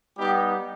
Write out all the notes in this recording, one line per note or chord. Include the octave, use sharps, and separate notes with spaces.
G3 B3 D#4 G4